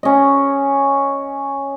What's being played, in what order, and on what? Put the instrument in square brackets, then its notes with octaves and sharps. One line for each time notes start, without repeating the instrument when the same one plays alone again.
[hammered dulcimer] C#4 D#5